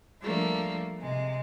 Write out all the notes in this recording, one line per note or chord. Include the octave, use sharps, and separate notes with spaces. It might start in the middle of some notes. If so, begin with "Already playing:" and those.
F3 G3 A3 A#3 D4
C3 G#3